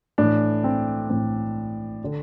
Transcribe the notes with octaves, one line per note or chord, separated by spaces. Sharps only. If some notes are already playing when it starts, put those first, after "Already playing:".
A2 E3 D4
C4
A2 E3 C4
D3